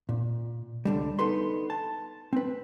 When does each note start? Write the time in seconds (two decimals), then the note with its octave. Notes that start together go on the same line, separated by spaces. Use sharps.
0.09 A#2
0.85 C#2 D3 G3
1.19 B3 D#4 A4 B4 C6
1.70 A5
2.33 C4 B4